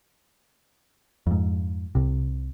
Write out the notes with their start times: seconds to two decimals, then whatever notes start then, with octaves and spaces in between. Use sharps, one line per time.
1.27 F2 G#2
1.95 C2 C3